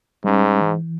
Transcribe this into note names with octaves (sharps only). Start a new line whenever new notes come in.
G#2 G3 C#4
E3